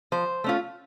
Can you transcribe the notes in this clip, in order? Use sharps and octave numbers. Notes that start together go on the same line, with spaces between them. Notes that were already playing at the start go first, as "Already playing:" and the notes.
F3 C5
A3 C#4 F4